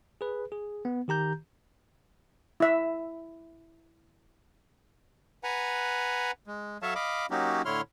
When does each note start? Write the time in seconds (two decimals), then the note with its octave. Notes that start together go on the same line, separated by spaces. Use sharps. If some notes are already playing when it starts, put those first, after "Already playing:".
0.21 G#4 B4
0.52 G#4
0.85 B3
1.08 D#3 G4 A#5 G6
2.60 E4 E5
5.44 B4 F#5 G#5 A#5
6.47 G#3
6.82 F#3 A4 C#5 E5 F5 A5
6.95 D#5 F5 B5 D6
7.31 F#3 A#3 C#4 D#4 F#4 G4
7.65 A2 D3 E4 C#5 C6 F6